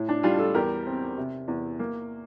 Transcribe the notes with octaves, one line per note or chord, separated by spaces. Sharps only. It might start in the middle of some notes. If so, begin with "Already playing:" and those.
Already playing: A2
D4
G3 D4 F4
F4 A4
E2 G4 A#4
C4
C3
E2
A#3